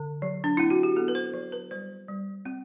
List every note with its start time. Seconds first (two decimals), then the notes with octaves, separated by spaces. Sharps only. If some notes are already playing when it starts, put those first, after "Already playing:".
Already playing: D3
0.22 F#3
0.44 D4
0.57 C4 E4
0.70 F#4
0.83 G4
0.96 B3 A4
1.08 B4
1.15 C5
1.34 F#3 C5
1.52 B4
1.71 G3 C5
2.08 G3
2.46 C4